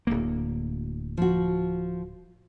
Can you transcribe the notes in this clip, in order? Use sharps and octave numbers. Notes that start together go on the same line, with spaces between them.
D1 D2 A#3
F3 F#4